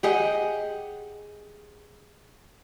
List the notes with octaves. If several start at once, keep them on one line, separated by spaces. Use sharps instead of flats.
G4 G#4 D#5 F#5